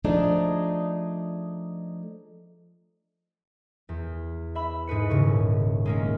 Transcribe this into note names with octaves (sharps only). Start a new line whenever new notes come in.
F3 A3 D4 D#4 G#4
E2
E5 B5
G#2 G#4 B4 C#7
D#1 C#3 C#6
G#3 A#3 C#4